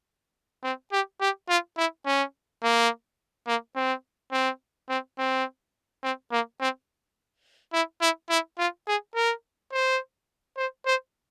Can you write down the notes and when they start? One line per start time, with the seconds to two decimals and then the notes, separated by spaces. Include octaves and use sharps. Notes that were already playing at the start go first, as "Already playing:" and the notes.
0.63 C4
0.92 G4
1.21 G4
1.49 F4
1.77 E4
2.06 C#4
2.63 A#3
3.47 A#3
3.76 C4
4.32 C4
4.89 C4
5.18 C4
6.03 C4
6.31 A#3
6.60 C4
7.73 E4
8.01 E4
8.29 E4
8.58 F4
8.87 G#4
9.15 A#4
9.72 C5
10.57 C5
10.86 C5